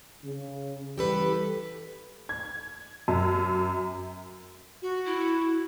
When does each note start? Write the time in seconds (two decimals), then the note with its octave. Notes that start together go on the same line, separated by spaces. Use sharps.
0.24 C#3
0.98 E3 G3 G4 A4 B4
2.29 G#6
3.08 F#2
4.82 F#4
5.06 E4